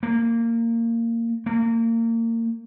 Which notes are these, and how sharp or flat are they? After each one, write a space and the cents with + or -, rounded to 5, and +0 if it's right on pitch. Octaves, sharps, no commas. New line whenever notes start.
A#3 -15
A#3 -30